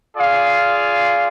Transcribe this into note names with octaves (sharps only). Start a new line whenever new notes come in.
F4 G#4 D5 F5